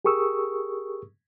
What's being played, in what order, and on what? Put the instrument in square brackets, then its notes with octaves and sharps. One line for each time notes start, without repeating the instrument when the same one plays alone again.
[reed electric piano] G4 G#4 A#4 C#6 D#6 E6